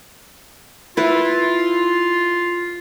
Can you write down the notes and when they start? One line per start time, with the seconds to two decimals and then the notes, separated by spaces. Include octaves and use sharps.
0.97 E4 F4 B4